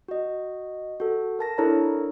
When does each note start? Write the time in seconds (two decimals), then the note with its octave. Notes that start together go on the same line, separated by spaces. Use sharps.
0.08 F#4 D#5
1.00 F#4 A4
1.39 A#4 A5 A#6
1.58 D4 E4 A4 A#4 C#5 A#5